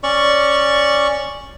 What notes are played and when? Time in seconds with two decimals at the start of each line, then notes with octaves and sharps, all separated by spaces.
0.03 C#4 D5 C#6